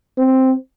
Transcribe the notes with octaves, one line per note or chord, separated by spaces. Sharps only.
C4